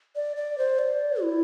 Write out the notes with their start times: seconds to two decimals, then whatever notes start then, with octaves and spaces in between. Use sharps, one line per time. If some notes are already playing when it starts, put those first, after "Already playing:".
0.16 D5
0.37 D5
0.58 C5
0.79 D5
1.22 E4